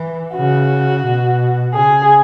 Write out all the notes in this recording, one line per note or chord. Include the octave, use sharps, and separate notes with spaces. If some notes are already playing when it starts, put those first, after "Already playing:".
Already playing: E3
C#3 F#4
B2
C#3 G#4